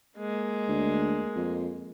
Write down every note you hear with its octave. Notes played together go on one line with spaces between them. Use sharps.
G#3 A#3
D2
F2